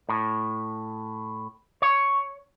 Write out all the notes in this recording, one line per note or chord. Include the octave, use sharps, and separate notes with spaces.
A2
C#5